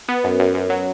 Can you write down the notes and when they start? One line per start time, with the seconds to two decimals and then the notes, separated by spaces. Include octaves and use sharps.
0.08 B3
0.24 F#2
0.40 F#2
0.54 F#2
0.70 F#3